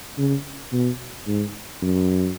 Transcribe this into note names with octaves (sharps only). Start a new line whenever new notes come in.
C#3
B2
G#2
F#2